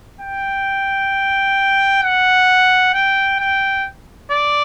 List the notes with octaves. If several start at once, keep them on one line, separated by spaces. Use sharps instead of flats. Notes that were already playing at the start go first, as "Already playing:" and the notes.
G5
F#5
G5
G5
D5